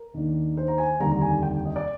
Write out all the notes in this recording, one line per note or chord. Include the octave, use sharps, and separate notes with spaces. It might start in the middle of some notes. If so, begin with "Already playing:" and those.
Already playing: A#4
D#2 D#3 A#3 D4
C5
A#5
G#5
F1 D#2 D3 G3 A#5
A#5
G#5
G5
D#5
D5